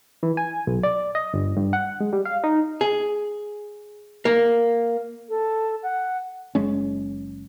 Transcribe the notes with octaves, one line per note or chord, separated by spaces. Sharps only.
E3
G#5
B1
D5
D#5
G1
G2
F#5
G#3
G3
F5
D#4
G#4
A#3
A4
F#5
F#1 G#3 C#4